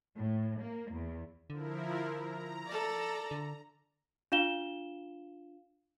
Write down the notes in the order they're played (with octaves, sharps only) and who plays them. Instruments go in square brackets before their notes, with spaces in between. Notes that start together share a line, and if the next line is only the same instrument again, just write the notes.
[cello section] A2
A#3
E2
[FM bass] D3 [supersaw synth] F3 E4 A#4
[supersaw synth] A#5
[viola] A4 D5
[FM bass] D3
[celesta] D4 F4 F5 E7 G7